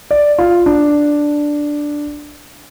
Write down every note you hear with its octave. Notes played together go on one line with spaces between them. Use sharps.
D5
F4
D4